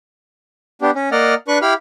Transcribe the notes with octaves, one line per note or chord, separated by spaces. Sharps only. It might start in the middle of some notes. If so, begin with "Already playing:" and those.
B3 D4 G4
C#4
A#3 D5 D#5 F#5 F6
D4 B4 C#6 F#6
E4 G4 F5 B5 F6